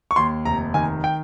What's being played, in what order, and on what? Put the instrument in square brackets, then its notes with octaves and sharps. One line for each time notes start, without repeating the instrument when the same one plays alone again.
[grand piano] C#6
D#2 C6
F1 A#5
D#3 G#5
G5